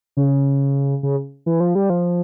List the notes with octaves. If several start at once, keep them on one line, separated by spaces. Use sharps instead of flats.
C#3
C#3
E3
F3
G3
F3